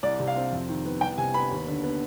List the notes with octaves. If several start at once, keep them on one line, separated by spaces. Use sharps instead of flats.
C2 D5
C3
F5
C4
F2
D#3
B3
C2 G5
C3 G#5
B3 B5
D#2
D3
B3